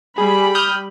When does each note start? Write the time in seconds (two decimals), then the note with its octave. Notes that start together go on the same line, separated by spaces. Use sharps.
0.18 G3 G#4 B5
0.55 D#6 F6 G6